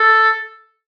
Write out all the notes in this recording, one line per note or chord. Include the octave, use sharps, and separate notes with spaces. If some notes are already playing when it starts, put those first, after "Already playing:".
Already playing: A4